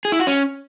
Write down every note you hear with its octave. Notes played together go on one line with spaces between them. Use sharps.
G#4
E4
F#4
C#4